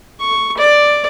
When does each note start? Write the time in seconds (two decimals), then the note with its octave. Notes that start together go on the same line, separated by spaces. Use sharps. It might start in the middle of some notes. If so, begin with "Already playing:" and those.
0.20 C#6
0.58 D5